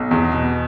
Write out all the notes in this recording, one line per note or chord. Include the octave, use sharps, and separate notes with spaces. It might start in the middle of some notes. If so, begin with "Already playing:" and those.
Already playing: B1
E2
B2